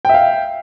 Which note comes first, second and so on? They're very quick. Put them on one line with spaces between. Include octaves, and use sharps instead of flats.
G5 E5 F5